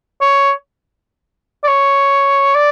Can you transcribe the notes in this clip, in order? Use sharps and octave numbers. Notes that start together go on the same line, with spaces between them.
C#5
D5
C#5
D5